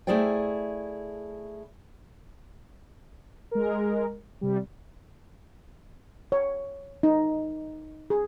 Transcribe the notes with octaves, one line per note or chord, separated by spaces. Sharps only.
A3 E4 G#4 C5 D5 G5
G#3 A#4
C3 G3
C#5
D#4
G#4